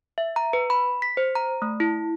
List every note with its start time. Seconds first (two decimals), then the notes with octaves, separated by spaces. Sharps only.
0.18 E5
0.36 A#5
0.53 B4
0.70 B5
1.02 B6
1.17 C5
1.35 A#5
1.62 A3
1.80 E4